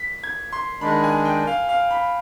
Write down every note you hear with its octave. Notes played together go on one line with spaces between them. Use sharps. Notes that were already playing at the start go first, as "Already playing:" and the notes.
Already playing: B6
G#6
C6
D#3 G#3 D4 B5
G#5
G5
F5
F5
B5